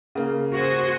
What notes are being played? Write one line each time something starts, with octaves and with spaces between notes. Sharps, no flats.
C#3 A#3
F#4 G#4 C5